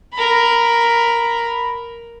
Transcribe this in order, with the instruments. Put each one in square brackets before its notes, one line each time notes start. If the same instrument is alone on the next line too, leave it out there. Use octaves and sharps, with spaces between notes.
[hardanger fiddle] A#4 B5